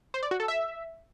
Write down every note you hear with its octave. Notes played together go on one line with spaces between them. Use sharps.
C5
D5
F#4
A4
E5